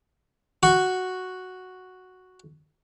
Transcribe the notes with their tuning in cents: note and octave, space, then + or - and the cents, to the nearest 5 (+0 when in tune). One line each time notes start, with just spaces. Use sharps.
F#4 +0 C#6 +0